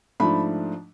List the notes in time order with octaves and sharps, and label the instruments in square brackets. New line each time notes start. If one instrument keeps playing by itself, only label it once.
[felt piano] G#2 F3 A3 D4 B5